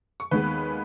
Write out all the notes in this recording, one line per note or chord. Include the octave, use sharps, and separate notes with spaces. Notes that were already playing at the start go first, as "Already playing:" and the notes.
C#6
D#2 D#3 G#3 B3 B4 B5